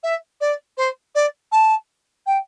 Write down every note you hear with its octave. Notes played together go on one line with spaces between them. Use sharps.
E5
D5
C5
D5
A5
G5